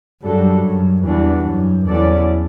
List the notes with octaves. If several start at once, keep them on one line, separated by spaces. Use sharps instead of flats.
F#2 G3 D4 F#4 A4
F#2
E2 E3 G3 D4 F#4
F#2
E2 F#3 C#4 E4 A4 D5